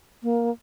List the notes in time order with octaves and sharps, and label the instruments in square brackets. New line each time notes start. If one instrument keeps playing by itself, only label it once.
[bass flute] A#3